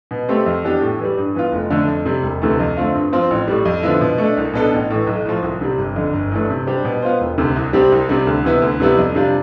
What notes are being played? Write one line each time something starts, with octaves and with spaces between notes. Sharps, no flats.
B2
A3 C4 G4
F2
E3 B3 D4 G4
A2
E3 G3
G2
E3 B3 F4
F1
F2 D3 A3 D4
F2
C3 G3
E1
D2 C3 E3 A3
F2
D3 A3 C4 F4
G2
F3 C4 F4 C5
A1
A2 G3
F2
D3 F3 B3 E4
B2
A3
D4
C2
B2 B3 D4 A4
A1
A2 E3
B1
A2 F3
C2
C3 G3
G1
F2 D3
G1
G2 E3 A3 D4
C3
G3 D4 G4 C5
B2
B3 F4 C5
E1
D2 C3
C2
C3 G3 C4 G4
C2
C3 G3
D2
C3 E3 B3 E4
D2
C3 G3 B3 E4
F2
C3 G3 D4 F4